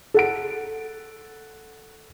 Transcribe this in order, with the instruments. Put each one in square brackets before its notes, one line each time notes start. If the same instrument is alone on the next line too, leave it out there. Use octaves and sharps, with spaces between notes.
[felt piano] A4 F#5 D7